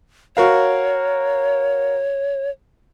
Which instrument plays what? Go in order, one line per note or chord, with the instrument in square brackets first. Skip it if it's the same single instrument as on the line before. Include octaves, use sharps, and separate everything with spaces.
[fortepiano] F#4 A#4 F5 [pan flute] C#5